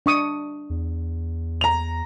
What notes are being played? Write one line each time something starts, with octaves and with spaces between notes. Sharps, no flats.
D4 C#6 D#6
E2
A#5 F7